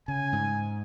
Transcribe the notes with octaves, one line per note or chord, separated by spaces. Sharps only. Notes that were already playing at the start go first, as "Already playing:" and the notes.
C#3 G#5
G#2